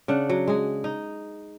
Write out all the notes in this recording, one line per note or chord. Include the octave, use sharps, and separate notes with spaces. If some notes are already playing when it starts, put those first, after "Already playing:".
C#3 D4 F#5
F#3
G#3 G#4
D#4